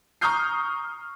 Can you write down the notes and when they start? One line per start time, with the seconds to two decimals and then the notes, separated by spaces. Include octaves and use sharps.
0.21 A#5 C#6 D#6 F6 G6 C7